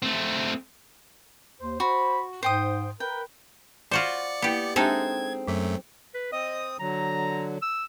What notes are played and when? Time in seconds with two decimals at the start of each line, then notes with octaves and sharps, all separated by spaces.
0.02 A3 C4
1.60 D#2 C5
1.80 F#4 C5 B5
2.43 G#2 C5 G5 D#6
3.00 A#4 B4 G5
3.91 F4 F#4 C5 D5 C#7
4.42 A#3 B3 E4 G4 G5
4.76 G#3 C4 D4 D#4 G4 A4 E5 G#6
5.48 F#2 F#3 A3
6.14 B4
6.32 C4 D#5 D#6
6.80 D3 F#3 A#5
7.62 E6